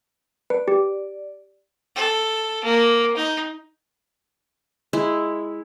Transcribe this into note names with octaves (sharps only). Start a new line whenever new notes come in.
B4 D5
G4
A4
A#3
D#4
G#3 E4